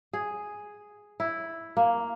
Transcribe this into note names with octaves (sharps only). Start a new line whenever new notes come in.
G#4
E4
A#3